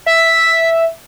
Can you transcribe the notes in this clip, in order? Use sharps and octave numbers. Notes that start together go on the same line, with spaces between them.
E5 B6